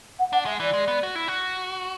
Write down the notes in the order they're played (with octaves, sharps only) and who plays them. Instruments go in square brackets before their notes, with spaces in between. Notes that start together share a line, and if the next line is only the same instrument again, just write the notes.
[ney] F#5
[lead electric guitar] D4 [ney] F#5
[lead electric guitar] G#3 [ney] E5
[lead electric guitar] E3 [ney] D5
[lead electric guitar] G#3
B3
F#4
E4
F#4